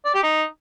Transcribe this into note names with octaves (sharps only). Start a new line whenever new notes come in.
D5
G4
D#4